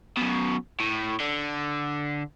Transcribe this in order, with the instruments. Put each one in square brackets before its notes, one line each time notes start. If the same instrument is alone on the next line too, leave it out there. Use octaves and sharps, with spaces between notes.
[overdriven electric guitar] F#2 B2
A2
D3